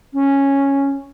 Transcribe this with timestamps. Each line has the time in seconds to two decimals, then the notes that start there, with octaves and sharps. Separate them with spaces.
0.13 C#4